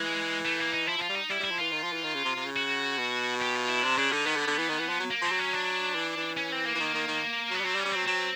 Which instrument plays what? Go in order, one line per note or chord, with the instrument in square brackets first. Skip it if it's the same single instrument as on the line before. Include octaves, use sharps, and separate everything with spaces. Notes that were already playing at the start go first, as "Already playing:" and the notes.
Already playing: [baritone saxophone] E3 [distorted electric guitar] G#3
[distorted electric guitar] A3
A#3
D#4
[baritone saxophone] F3 [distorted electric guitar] E4
[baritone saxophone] F3 [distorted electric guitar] F4
[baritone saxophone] G3
[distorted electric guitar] D#4
[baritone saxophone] G3 [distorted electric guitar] E4
[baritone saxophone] G3 [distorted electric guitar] E4
[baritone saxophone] F3
[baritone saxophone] E3 [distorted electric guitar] F4
[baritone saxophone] D#3
F3
E3
D#3
C#3
C3
C3
C#3
[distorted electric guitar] F#4
[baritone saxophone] B2
[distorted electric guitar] G4
F4
E4
[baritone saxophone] C3 [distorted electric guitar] D4
[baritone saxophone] C#3 [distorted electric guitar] D4
[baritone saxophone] D3 [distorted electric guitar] D#4
[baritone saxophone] D#3 [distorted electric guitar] B3
[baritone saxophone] D3
D3
E3
D#3
E3
F3
F#3
[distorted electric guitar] A#3
[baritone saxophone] F3 [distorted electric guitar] C4
[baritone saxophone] F#3
[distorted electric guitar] C#4
D4
[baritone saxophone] E3
E3
[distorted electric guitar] C#4
C4
A#3
[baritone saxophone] E3
D#3
D#3
D#3
[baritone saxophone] F#3 [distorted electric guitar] B3
[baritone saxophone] G3
[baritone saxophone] F#3 [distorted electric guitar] C4
[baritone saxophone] G3
[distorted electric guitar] C#4
[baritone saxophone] G3
[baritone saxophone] F#3 [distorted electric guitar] C4
[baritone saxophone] F#3 [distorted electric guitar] C4